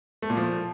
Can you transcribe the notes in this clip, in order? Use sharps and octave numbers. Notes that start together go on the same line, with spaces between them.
A3
A#2
F3